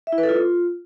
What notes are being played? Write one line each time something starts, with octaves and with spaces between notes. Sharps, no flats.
E5
E4
B4
A4
F4